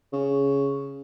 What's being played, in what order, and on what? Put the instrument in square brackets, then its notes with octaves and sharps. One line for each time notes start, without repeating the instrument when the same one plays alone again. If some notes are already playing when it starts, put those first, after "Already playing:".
[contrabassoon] C#3